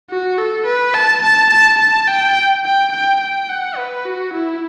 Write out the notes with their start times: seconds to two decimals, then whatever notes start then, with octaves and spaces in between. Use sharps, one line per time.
0.10 F#4
0.38 A4
0.66 B4
0.94 A5
1.23 A5
1.51 A5
1.80 A5
2.08 G5
2.64 G5
2.93 G5
3.21 G5
3.49 F#5
3.77 B4
4.06 F#4
4.33 E4